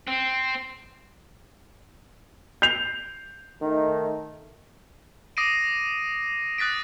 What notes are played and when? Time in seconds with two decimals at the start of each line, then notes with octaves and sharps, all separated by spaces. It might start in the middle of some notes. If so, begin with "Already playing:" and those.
0.08 C4
2.62 G6 C7 F7
3.61 D#3 A3 D#4
5.37 D6 D#6 A#6 C7 D7 D#7
6.58 D#6 F#6 A6 B6 D7